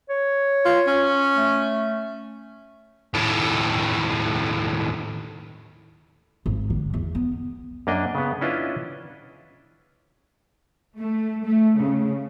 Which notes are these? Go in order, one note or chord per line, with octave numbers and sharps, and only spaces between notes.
C#5
F4
C#4
A3
D#2 A2
G#1
D3
E2
B3
F#2 A#3 D4 D#5
C#3 B3
C#4 D4 E4 F4 B4 D#5
A3
A3
C#3